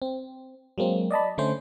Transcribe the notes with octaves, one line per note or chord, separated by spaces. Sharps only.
C4
F#3 G#3 A#3 C4
D5 D#5 A5 B5
D3 A3 C#4 C5